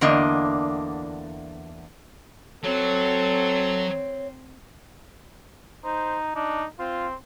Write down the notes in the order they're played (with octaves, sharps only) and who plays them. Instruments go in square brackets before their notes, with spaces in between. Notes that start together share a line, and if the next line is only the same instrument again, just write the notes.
[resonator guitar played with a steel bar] E2 D3 A#3 D4 D#5
[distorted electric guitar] F#3 [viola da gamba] C4 [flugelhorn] A4 [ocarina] C#5
[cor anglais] D#4 [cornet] C5
[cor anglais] D4 [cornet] D#4
[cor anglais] C4 [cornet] F4